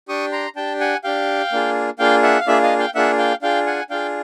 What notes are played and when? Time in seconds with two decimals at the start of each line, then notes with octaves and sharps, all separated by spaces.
0.08 D4 G4 C#6 D#6
0.32 A#5 C6
0.56 D4 G4 G5 A5
0.80 F#5 G#5
1.04 D4 G4 F5 G5
1.52 A#3 D4 F4 G#4
1.99 A#3 D4 F4 G#4 F5 G5
2.23 E5 F#5
2.40 F5
2.47 A#3 D4 F4 G#4 D5 E5
2.63 D#5 F5
2.79 F5 G5
2.95 A#3 D4 F4 G#4 E5 F#5
3.18 F5 G5
3.42 D4 F4 G#4 F5 G5
3.66 F#5 G#5
3.90 D4 F4 G#4 F5 G5